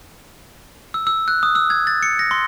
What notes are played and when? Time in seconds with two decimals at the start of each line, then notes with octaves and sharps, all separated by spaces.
0.94 E6
1.07 E6
1.28 F#6
1.43 D#6
1.55 E6
1.70 G#6
1.87 A6
2.03 C#7
2.19 A#6
2.31 C6